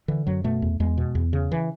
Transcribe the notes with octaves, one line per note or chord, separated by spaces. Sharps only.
D3 E3
F#2 F#3
B2 A3
E2
E2 G#3
B2
E2
C#3
E3